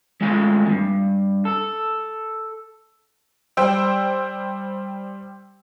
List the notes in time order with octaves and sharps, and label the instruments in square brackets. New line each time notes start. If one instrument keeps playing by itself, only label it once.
[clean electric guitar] G#3 A3 F4 G#5
E2 G2
A4
[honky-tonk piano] G3 C5 G5 E6